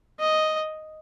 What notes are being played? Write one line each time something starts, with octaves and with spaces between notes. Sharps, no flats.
D#5